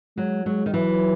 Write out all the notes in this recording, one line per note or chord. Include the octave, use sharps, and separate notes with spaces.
F#3 G#3
F#3 G#3
D#3
E3 F#3